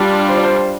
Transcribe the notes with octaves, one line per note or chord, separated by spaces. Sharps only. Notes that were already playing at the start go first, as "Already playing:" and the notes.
Already playing: G3 D4 F4 D5
C5
D5
C5